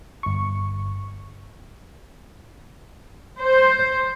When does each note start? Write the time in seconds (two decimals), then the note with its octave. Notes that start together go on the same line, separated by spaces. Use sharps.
0.23 G1 C#6
3.40 C5